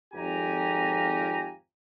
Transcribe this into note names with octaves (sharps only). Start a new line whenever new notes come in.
G#1 F2 F4 G4 G#5 A#5